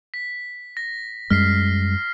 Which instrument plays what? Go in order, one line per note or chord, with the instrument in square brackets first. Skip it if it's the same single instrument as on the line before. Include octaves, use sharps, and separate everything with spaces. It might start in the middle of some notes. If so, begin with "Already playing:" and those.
[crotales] B6
A#6
[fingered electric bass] F#2 G3 G#3 [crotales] F6 B6 C7